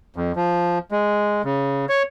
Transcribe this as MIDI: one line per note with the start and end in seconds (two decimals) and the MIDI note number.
0.16 0.32 41
0.36 0.79 53
0.91 1.42 56
1.44 1.86 49
1.89 2.03 73